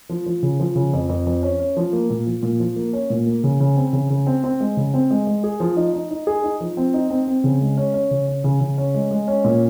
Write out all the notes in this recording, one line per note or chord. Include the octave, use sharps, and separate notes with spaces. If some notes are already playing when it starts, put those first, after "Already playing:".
F3
F3
C#3
F3
C#3
F2
F2
F2
C#4
C#4
F3
A#3
A#2
F3
A#2
F3
A#3
C#4
A#2
A#3
C#3
C#3
C4
C#3
C#3
C4
C4
G#3
C#3
C4
G#3
G#3
G#4
F3
D#4
D#4
D#4
G#4
D#4
F3
C4
D#4
C4
C4
C#3
G#3
C#4
C#4
C#3
C#4
C#3
C#3
C#4
G#3
G#3
C#4
A#2